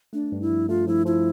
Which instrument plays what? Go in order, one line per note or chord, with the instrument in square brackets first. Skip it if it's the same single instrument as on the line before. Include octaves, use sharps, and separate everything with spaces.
[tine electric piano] A3 [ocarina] D4
[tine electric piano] G2
[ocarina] E4
[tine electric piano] F3
[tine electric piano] A3 [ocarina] F4
[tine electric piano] F3 [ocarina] E4
[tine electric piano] F3 [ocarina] E4